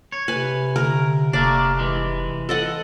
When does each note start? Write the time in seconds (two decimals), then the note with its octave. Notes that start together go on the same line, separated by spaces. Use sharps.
0.12 C#5
0.28 C3 B4 G#5
0.76 D3 A#4 A#5
1.33 F1 A3 A#3 D4 D5
1.79 E3 G#3
2.49 A4 D#5 F#5